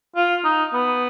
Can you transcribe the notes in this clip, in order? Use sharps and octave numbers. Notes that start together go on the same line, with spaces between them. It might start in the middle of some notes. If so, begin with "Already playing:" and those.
F4
D#4
B3